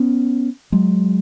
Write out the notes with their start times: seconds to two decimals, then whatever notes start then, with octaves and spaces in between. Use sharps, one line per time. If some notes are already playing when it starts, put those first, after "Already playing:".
Already playing: B3 C#4
0.72 F#3 G#3